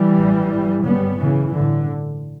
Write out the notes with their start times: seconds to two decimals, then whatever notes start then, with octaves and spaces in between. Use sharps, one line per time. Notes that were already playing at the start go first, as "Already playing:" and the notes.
Already playing: E3 G3
0.18 A1 G2
0.52 G1 G2
0.85 G1 F#2 C#3 G3 B3
1.19 B1 A2 C#3 E3
1.54 A1 G2 D3